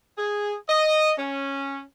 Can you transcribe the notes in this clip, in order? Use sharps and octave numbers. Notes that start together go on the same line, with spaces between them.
G#4
D#5
C#4